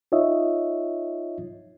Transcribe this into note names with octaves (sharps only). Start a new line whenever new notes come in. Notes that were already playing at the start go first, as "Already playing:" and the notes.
D#4 F4 C#5 D#5 E5